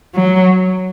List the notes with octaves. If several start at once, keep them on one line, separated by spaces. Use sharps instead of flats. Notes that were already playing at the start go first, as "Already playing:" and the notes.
F#3